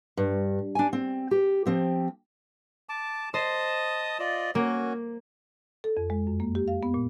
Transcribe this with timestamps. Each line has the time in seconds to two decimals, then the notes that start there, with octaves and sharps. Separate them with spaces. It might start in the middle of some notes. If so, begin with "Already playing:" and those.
0.17 G2
0.75 D4 G#5
0.93 C4
1.31 G4
1.66 F3 C4 G4
2.89 A5 D6
3.34 C5 D#5 A5 D#6
4.19 F4 D5 D#5
4.55 A#3 C#4 F#4
5.84 A4
5.97 F2
6.10 G#3
6.27 F#2
6.40 A#3
6.55 G4
6.68 F5
6.83 B3
6.94 A#2